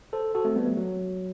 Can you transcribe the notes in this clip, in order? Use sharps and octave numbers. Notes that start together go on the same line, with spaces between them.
A4 C5
F#4 A4
A3 C4
G3 B3
F#3 A3
F#3